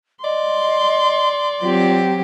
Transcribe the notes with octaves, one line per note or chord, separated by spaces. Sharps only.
D5 D#5 C6
F#3 C4 F4 G4